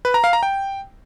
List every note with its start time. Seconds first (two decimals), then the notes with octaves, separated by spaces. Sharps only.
0.05 B4
0.14 A#5
0.24 F5
0.33 A#5
0.43 G5